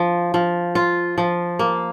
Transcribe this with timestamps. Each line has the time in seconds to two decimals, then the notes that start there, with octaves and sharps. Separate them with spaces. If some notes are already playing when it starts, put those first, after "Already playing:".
Already playing: F3
0.34 F3
0.75 F4
1.18 F3
1.59 A#3